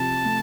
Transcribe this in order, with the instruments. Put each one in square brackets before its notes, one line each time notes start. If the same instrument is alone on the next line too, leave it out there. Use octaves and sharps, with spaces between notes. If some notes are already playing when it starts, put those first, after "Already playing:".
Already playing: [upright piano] C3 F3 [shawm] A5
[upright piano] A3